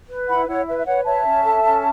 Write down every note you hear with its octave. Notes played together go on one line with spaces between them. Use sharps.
B4
E4 F#5 B5
E4 C#5 F#5
B4 E5
E5
B4 C#5 F#5
C#5 E5 A5
C#4
A4
C#4